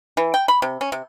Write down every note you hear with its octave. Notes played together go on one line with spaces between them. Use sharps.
E3
G5
B5
C3
C#4
C3